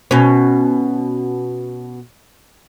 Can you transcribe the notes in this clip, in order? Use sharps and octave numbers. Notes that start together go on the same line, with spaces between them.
B2 C#4